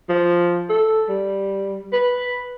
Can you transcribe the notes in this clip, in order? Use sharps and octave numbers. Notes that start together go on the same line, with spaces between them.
F3
A4
G3
B4